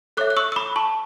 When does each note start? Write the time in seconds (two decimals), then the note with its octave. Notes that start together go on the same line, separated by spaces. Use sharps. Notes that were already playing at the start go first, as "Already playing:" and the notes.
0.17 A4 C#5 E5 D6 F#6
0.30 F#6
0.37 C#6 E6
0.52 E6
0.56 B5 D6
0.76 A5 C#6